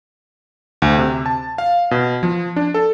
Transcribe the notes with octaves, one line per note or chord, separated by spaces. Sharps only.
D2
C3
A5
F5
B2
F3
D4
A4